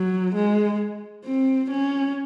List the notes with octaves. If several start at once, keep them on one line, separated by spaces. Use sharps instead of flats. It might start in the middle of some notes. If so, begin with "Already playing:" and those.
Already playing: F#3
G#3
C4
C#4